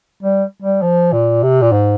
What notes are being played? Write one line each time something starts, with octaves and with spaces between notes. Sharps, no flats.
G3
G3
F3
A#2
C3
A#2
G#2